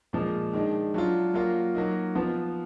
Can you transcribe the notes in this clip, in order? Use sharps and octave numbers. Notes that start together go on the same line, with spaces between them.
A#2 F3 G#3
D#3 G#3 D4
F#3 D4 F4
F#3 A#3 F4
F#3 A#3 D#4
F3 B3 F4